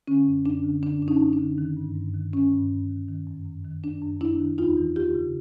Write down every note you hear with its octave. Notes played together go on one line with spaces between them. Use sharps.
D3 C#4
F#2
F#2 D4
D3
D3 D4
F#2 D4
C#4 D#4
F#2
D4
D3
D#3
G2
G2
D#3
D#3 C#4
G2
G2
D#3
D#3
F#2
F#2
D#3
D#3 D4
F#2
F#2 D4 E4
D#3
E2 D#4 F4
E3
E2 F4 G4
C#3